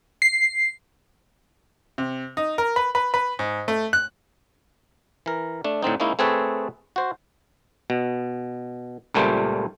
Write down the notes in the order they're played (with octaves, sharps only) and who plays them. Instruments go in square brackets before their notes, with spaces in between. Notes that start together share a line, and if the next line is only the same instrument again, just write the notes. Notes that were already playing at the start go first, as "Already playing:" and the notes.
[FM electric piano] C7
[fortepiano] C3
D#4
A#4
B4
B4
B4
G#2
A3
F#6
[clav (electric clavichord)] E3 A#4
A3 D4
A2 D3 C4 D#4
G#3 A#3 C#4 D#4 E4
A3 C4 G#4 A4 B4 C#5
F#4 C5
B2
C#2 A#2 G3 A3 C5